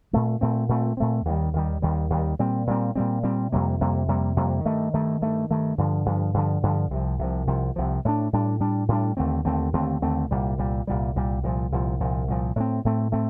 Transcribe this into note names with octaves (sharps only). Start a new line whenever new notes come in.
A#2 A3 C4
A#2 A3 C4
A#2 A3 C4
A#2 A3 C4
D#2 D#3 G3
D#2 D#3 G3
D#2 D#3 G3
D#2 D#3 G3
A#2 G3 C4
A#2 G3 C4
A#2 G3 C4
A#2 G3 C4
F2 C3 G3 A#3
F2 C3 G3 A#3
F2 C3 G3 A#3
F2 C3 G3 A#3
G2 D#3 A3
G2 D#3 A3
G2 D#3 A3
G2 D#3 A3
G2 D3 F3
G2 D3 F3
G2 D3 F3
G2 D3 F3
C2 C3 F3
C2 C3 F3
C2 C3 F3
C2 C3 F3
A2 G3 D4
A2 G3 D4
A2 G3 D4
A2 G3 D4
D#2 D3 A3 C4
D#2 D3 A3 C4
D#2 D3 A3 C4
D#2 D3 A3 C4
C2 A#2 G3
C2 A#2 G3
C2 A#2 G3
C2 A#2 G3
C2 A#2 F3
C2 A#2 F3
C2 A#2 F3
C2 A#2 F3
A2 A3 C4
A2 A3 C4
A2 A3 C4